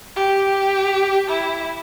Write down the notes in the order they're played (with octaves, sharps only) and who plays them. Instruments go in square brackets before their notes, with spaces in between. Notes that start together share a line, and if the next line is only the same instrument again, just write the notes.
[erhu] G4
E4